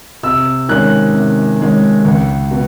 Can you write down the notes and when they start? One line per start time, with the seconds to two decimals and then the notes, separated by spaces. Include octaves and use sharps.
0.23 C3 E6
0.69 D#3 G#3 C#4 F#6
1.14 C3
1.60 D#3 G#3 C#4
2.05 C#2
2.51 B2